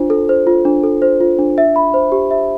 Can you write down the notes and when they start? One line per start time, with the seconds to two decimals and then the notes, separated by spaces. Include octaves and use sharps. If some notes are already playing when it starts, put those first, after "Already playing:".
Already playing: D4 F4 C5
0.10 A4
0.29 C5
0.47 F4
0.65 D4
0.83 A4
1.02 C5
1.21 F4
1.39 D4
1.58 E5
1.76 B5
1.94 C5
2.12 G4
2.31 E5